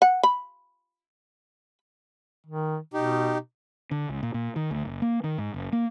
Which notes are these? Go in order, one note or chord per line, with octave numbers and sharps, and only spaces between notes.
F#5
B5
D#3
B2 D#4 G4
D3
C#2
A#2
A#2
D#3
D2
F#1
A#3
D#3
G#2
F#1
A#3